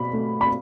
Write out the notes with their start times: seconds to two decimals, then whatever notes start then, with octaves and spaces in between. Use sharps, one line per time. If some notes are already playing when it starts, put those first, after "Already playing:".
Already playing: B2 B5
0.13 A3
0.41 B5